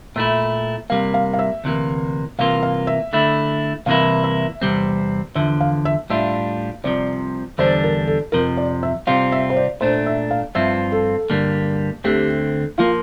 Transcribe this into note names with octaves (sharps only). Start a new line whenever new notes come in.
A#2 A3 E4 E5
C3 G3 A#3 F5
F5
F5
E5
D2 C3 E3 A#3
C2 C3 E3 A#3 F4 F5
F5
E5
D3 A3 E4
C2 C3 E3 A#3 E4 F5
E5
E2 C3 G3 C4
E2 D3 F3 E5
F5
E5
A2 G3 D4 F4 E5
C2 C3 F3 D5
E2 D3 G3 D4 C5
A#4
A4
F2 C3 F3 A#4
D5
E5
C3 G3 C4 F4 F5
E5
C5
D5
A#2 A3 D4 C5
E5
F5
G2 F3 C4 F4 E5
A4
G2 D3 G3 A#3
D2 D3 A3 C4 G4
F3 A#3 F4